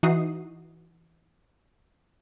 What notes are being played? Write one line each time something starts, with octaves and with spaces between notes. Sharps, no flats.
E3 D#4 F#4 E5 D#6 C7